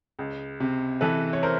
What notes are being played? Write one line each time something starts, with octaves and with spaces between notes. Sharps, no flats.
C#2
C3
E3 A4 B4
C#5
A#4 C5